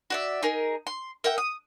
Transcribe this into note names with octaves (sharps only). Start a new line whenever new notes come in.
F#4 D5 E5
D#4 G#4 A#4
C6
A#4 E5 F#5 G5
D#6